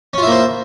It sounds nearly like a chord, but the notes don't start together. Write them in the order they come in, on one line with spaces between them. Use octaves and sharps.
C#4 F4 E4 A#3 C5